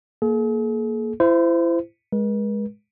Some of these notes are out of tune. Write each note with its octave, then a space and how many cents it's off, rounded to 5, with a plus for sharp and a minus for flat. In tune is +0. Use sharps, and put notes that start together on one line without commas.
A#3 +0 G#4 +45
E4 +30 C5 -25
G#3 +0 B4 -45